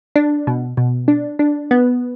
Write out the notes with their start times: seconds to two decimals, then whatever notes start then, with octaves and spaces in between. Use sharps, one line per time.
0.16 D4
0.47 B2
0.77 B2
1.08 D4
1.39 D4
1.71 B3